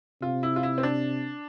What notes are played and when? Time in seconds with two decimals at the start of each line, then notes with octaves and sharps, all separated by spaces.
0.22 C3 F4
0.43 E4
0.56 F4
0.63 E4
0.78 C4
0.83 D4